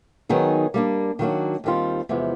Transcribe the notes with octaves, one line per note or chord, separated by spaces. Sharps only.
D#3 F#3 B3 D#4 G#4
G3 A#3 D4
D#3 F#3 A#3 D4 F#4
D#2 D#3 G3 C4 F4
E2 C3 F3 G#3 B3